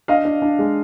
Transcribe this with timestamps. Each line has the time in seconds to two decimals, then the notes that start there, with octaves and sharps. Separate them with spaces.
0.08 D4 D#5 F5
0.25 D4
0.42 D4
0.59 G#3